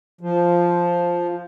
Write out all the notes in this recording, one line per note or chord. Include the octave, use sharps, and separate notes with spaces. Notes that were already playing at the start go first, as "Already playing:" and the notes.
F3